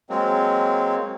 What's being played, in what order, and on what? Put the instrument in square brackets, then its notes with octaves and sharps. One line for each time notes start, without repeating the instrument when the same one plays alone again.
[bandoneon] F#3 G#3 A#3 C4